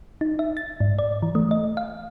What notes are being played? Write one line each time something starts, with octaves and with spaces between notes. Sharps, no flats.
D#4
E5
A6
G#2
D5
E3
A3
D#5
F5